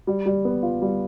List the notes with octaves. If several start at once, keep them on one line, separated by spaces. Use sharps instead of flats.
G3
G3
B3
F4
G3